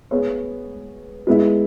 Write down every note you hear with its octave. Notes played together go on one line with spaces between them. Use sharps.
B3 G#4 C#5
G#3 B3 E4